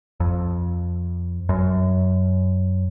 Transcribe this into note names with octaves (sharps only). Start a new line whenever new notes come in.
F2
F#2